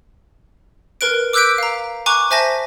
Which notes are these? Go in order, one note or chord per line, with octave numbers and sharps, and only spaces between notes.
A#4 B4 F#6 D7
D6 E6 F#6 G6 B6 D7
F5 A#5
G#5 A#5 C#6 D6 F#6
C5 E5 G#5 A5 A#6 B6